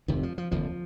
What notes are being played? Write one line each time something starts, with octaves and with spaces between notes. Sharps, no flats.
F1 F2 C3 D#3
F3
F3
F1 D#2 D3 F3